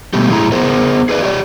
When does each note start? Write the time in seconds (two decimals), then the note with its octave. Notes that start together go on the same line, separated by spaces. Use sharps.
0.13 B2 G3 A3 B3 G4
0.30 A2 F#3 E4 G#4 G#5 A#5
0.52 B3 G#4 A#4 C5
1.09 G#4 B4 D5
1.23 G4 C#5 D5